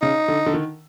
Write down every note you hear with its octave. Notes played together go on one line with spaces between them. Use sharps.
C#3 D#4
D3
D3
D#3